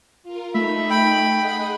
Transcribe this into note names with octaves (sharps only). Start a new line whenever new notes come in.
F4 A#4
A3 D#4 E5 B5
G5 B5
G#4 D#5 F#5